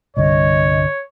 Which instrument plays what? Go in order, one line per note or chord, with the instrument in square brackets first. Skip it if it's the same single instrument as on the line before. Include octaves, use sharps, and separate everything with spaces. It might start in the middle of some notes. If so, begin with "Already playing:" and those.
[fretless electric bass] C2 G2 D3 [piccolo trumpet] C#5 [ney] D#5